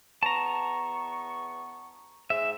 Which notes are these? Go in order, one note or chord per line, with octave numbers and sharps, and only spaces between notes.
E2 B3 A5 A#5 C#6
G#2 E5